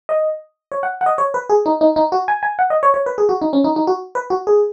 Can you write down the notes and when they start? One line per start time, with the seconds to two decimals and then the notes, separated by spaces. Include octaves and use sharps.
0.09 D#5
0.72 C#5
0.83 F#5
1.01 F#5
1.06 D#5
1.18 C#5
1.34 B4
1.49 G#4
1.66 D#4
1.81 D#4
1.96 D#4
2.12 F#4
2.28 G#5
2.43 G#5
2.59 F#5
2.70 D#5
2.83 C#5
2.94 C#5
3.06 B4
3.18 G#4
3.29 F#4
3.42 D#4
3.53 C#4
3.64 D#4
3.76 D#4
3.87 F#4
4.15 B4
4.30 F#4
4.47 G#4